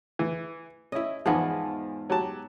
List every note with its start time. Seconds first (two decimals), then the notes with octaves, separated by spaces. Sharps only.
0.19 E3
0.92 C#4 E4 D#5 E5
1.26 E2 G#2 F3 B3 G#4
2.10 F#3 G4 A5